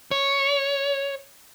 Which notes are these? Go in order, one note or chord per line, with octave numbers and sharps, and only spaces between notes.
C#5